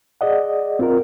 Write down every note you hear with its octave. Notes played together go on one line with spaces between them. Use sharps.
G#4 D5 D#5 F#5
C4 F4 A#4